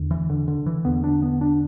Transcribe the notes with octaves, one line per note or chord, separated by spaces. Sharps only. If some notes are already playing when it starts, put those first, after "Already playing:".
Already playing: E2 D3
E3
D3
D3
E3
E2 D3 B3
D4
B3
D4